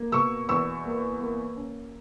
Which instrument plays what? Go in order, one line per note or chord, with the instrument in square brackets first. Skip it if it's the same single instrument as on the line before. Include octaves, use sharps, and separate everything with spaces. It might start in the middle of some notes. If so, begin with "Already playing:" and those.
Already playing: [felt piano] A#3
B2 C#6 E6
E2 C#6 E6
A#3
A#3
C#4